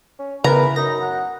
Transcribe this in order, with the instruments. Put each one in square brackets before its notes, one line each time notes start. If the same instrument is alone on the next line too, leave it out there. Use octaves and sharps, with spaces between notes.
[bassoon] C#4
[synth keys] C#3 B3 A#4 [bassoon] E3 [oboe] B4 [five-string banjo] A#5
[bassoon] F#2 [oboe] D#4 [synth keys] A#6
[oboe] F#5